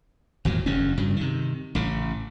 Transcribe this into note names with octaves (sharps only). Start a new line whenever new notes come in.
G#1 E2 A#2 F#3
F#1 E2 G2 C#4
G2 C#3 F#3
C3 D#3
A1 A2 C#3